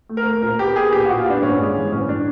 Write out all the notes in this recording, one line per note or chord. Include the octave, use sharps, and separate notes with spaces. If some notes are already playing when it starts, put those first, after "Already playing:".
A3
A#4
A3
A#2 A#4
B3 G4
B3 G#4
A#2 G4
A#2 F#4
F4
B3 D4
G2 C#4
G#3
E3
G2 C#4
D4